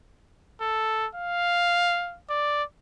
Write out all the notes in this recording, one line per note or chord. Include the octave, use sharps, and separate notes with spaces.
A4
F5
D5